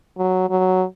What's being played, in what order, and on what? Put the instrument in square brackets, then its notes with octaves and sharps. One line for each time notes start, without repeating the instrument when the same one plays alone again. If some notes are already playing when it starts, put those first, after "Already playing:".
[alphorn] F#3
F#3